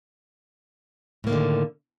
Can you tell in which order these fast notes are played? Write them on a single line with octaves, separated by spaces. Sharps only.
A2 A#3 D#3 D3